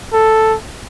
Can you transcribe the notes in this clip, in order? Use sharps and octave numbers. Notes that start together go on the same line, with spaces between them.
A4